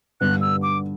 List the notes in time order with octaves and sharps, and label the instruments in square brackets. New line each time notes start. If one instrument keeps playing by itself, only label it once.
[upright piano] G2 D3 G3 B3 [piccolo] F#6
[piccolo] E6
D6